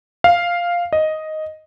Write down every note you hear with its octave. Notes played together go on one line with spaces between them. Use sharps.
F5
D#5